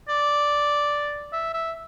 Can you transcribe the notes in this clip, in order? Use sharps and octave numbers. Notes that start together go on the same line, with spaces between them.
D5
E5
E5